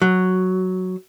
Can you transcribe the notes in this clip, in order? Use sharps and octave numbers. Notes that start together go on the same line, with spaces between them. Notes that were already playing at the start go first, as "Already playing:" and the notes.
F#3